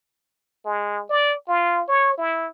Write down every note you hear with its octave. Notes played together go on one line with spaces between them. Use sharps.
G#3
D5
F4
C#5
E4